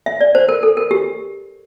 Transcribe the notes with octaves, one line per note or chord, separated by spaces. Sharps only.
E5
D5
C5
A#4
A4
A#4
G4